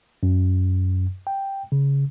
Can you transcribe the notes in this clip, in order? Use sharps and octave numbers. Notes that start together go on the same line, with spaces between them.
F#2
G5
C#3